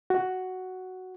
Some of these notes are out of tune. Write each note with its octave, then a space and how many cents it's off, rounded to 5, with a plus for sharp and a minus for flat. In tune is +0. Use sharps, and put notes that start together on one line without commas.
F#4 +5